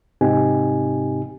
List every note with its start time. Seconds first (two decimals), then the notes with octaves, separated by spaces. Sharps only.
0.21 G#2 C3 C4 D#4 G4 G#5